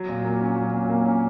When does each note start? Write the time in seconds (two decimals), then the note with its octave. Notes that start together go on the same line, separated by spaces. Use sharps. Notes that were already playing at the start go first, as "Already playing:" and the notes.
Already playing: F#3
0.09 A#2
0.25 A#3
0.41 C#4
0.56 F#3
0.73 A#2
0.89 A#3
1.06 C#4